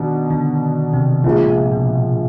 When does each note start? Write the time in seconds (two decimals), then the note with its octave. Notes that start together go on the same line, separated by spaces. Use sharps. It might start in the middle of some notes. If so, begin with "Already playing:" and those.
Already playing: B2 D#3 D4
0.30 D3
0.93 C3
1.24 A#1 A#2 C#3 F3 G#3
1.48 C3
1.72 B2